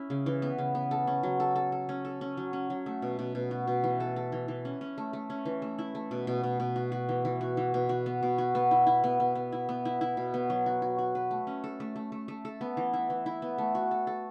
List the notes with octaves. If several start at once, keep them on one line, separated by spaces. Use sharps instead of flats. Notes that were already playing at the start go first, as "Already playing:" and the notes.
Already playing: C#4 E4
C#3
E3
B3
C#3
B3
A4
C#4
F#3
A4
A4
A4
C#4
A4
C#4
F#3
C#4
F#3
A3
B2
B2
B2
F#4
B2
E3
A4
A4
E3
E3
C#4
C#4
A3
A3
C#4
E3
A3
E4
A3
B2
B2
B2
B2
F#4
F#4
E3
E3
F#4
E3
B2
F#4
B3
B2
F#4
B3
E4
E4
B3
B3
B3
E4
B3
E4
E4
B2
B3
F#3
F#4
F#4
F#4
B4
A3
C#4
A4
A3
A3
A3
A3
A4
B3
E3
E4
E3
E4
B3
A3
F#4
A4
A4